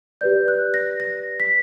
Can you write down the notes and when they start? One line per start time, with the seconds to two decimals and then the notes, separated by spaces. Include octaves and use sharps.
0.21 G4 B4 D5 G6
0.48 F#6
0.74 A#6
1.00 A#6
1.40 B6